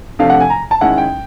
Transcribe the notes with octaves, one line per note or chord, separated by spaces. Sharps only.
C3 F3 A3 D4 F5
F#5
G#5
A#5
A5
D#3 G#3 C#4 E4 F#5
G5